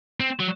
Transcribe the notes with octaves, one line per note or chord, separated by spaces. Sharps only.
C4
F#3